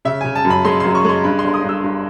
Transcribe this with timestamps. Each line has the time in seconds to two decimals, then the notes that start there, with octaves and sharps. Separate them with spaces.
0.05 C#3 E5
0.21 C#3 G#5
0.35 A5
0.45 F#2
0.50 B5
0.65 G#3 C6
0.80 F#2 C6
0.95 C#6
1.05 G#3 C6
1.24 G2 B5
1.39 C6
1.44 G1
1.54 D#6
1.64 G2 E6
1.84 G2